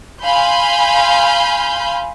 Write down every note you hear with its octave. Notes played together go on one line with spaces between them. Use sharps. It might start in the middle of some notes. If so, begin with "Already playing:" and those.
F5 G#5 B5 C6 G6